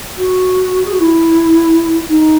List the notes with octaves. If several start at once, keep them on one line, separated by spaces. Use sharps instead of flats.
F#4
G#4
F#4
E4
D#4